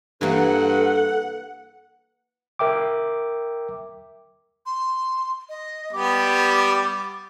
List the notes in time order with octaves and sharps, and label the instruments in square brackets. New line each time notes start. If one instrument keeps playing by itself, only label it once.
[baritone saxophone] G2 [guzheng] E3 A#3 [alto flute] A4 [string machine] F#5
[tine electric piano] A#4 E5 G5 D6
[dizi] C6
D#5
[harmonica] G3 B3 G4 [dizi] D6